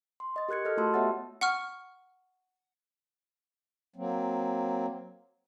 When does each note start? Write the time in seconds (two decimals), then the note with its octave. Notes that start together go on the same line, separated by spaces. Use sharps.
0.20 C6
0.36 D#5 A6
0.49 G4 A#4 F#6 G#6 C#7
0.65 A4 D#5 F6
0.77 A3 F4 F#4 A5 C6 E6
0.94 B3 G4 C#5 E5 F#5 A6
1.41 F#5 C#6 F6
3.96 F#3 A#3 C4